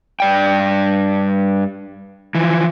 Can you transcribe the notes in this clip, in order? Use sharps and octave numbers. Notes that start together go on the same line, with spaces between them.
G2 D5 G5
E3 F3